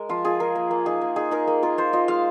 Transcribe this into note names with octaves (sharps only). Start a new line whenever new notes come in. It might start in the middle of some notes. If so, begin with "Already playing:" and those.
Already playing: G#3 A#4
F3 F4
F4 G#4
F4 A#4
A#3
A#3
D#4 G#4
A#3
D#4 G#4
D#4 A#4
A#3
F4 A#4
F4 C5
F4 D#5
G#3 F5